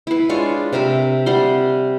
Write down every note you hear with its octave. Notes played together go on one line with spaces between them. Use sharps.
E4 B4
G#3 D4 F4 C#5
C3 C4 A#4 E5
C3 G3 F#5 C6